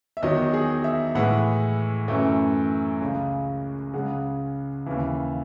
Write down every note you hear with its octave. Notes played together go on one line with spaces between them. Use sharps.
E5
E2 D#3 F#3 D#5
G#4
E5
A2 E3 G#3 F#5
F#2 E3 A3
C#2 C#3 G#3
C#2 C#3 G#3 F#5
D#2 C#3 E3